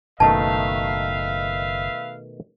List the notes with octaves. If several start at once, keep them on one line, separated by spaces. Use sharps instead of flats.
F#1 B2 D#3 A3 B4 E5 F5 A5